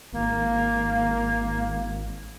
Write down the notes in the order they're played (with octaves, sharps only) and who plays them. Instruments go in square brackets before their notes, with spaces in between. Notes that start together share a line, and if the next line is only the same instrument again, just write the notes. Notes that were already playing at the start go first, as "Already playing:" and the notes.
[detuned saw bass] G#1 [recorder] A#3